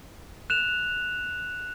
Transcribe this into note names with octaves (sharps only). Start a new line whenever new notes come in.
F#6 E7 F7